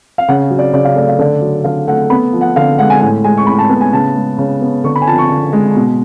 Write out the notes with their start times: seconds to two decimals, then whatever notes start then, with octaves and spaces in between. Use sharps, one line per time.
0.18 F5
0.28 C#3 F#5
0.50 F#3
0.59 D5
0.73 C#3 D5
0.85 F5
0.96 A3 D5
1.08 F5
1.19 D3 D5
1.41 F#3
1.64 D3 F5
1.87 A3 F#5
2.10 B3 B5
2.33 F3
2.41 F#5
2.56 D3 F5
2.79 G#3 F#5
2.90 G#5
3.01 A2 G#5
3.24 G#3 G#5
3.38 C#6
3.47 A2 B5
3.59 A5
3.70 B3 A5
3.81 G#5
3.93 C#3 A5
4.16 G#3
4.38 C#3
4.61 B3
4.84 D3 C#6
4.96 B5
5.02 G#5
5.07 F3 A5
5.18 C#6
5.30 D3
5.53 G#3
5.76 B2